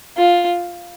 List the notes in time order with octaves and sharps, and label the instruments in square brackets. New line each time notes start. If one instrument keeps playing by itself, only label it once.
[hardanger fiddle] F4